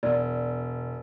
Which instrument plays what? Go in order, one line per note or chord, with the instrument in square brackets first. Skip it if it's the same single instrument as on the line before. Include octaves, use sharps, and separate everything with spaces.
[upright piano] E1 [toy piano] D5